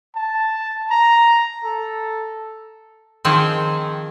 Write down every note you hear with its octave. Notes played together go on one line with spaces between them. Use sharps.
A5
A#5
A4
D#3 F3 C4 G#4